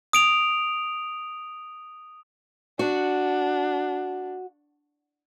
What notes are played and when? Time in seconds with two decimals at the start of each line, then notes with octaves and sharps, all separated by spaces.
0.13 D#6 D7 F7
2.79 D4 F#4